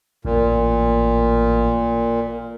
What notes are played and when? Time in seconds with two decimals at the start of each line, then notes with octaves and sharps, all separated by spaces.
0.25 A1 A#2